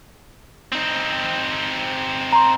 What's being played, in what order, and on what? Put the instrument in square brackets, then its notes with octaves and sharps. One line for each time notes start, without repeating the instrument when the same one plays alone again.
[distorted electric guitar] C4 D#4
[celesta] A#5 C6